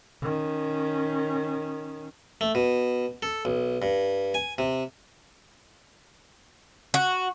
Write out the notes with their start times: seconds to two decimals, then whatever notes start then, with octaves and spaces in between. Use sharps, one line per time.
0.22 D#3 C#4
2.41 A3
2.55 B2
3.22 A4
3.45 B1
3.82 G2
4.34 G#5
4.58 C3
6.94 F#4